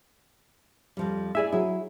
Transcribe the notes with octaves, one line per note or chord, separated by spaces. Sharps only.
F2 F3 G3
E4 G#4 D5 E5 G#5
F#3 E4 G#4